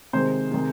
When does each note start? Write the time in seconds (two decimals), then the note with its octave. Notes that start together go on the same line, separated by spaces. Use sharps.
0.13 C3 D#3 G#3 C5
0.52 C3 D#3 G#3